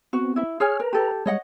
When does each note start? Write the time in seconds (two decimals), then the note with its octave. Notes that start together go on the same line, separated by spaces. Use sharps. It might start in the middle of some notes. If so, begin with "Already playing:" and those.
0.13 B3 C4 F#4
0.36 E4 E5
0.60 G#4 C#5 G#5 F6
0.80 A#4 B4 A#5
0.93 G4 A4
1.26 G3 G#3 C#5 D#5 F#5